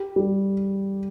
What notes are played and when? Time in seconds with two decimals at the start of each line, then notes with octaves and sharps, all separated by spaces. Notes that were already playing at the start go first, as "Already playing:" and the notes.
Already playing: G4
0.16 G3